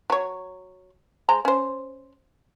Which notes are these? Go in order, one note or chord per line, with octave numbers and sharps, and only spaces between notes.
F#3 C#5
G#3 C5 A#5
C#4 C5